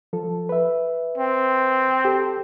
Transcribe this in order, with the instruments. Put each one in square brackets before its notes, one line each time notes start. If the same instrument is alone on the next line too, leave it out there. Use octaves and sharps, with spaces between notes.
[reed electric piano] F3 A4
B4 E5
[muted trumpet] C4
[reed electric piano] G4 A4